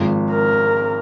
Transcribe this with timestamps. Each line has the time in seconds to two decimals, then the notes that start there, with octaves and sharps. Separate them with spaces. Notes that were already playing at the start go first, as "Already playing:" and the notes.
Already playing: G#1 G#2 F3 A#3
0.30 A#4